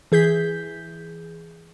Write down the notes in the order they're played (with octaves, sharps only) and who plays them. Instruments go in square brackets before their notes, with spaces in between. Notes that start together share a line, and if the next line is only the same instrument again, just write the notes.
[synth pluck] E3 G#4 G6 B6